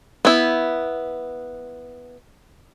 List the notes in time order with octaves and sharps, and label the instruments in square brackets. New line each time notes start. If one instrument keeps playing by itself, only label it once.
[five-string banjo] B3 E4